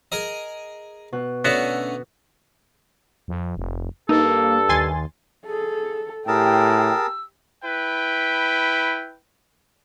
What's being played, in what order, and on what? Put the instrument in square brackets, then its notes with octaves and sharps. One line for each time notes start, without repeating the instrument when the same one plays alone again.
[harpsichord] G#4 A#4 D#5
[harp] B2 F#6
[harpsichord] D3 A3 C#4 [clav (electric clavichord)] B3 F#4
[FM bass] F2
F1
[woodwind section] G2 A4 [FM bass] A#3 [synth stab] D#4
[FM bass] D#2 [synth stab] G#5 C6 A6
[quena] G#4 [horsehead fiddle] A4
[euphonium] A2 [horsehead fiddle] G4 G5 [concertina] G#4 A#4 A5 [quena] E6
[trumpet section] E4 B4 G5